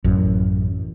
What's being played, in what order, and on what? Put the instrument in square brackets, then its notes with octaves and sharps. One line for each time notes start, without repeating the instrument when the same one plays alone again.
[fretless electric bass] A1 F#2